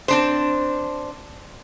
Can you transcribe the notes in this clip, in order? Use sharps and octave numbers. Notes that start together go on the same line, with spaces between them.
C4 D4 C5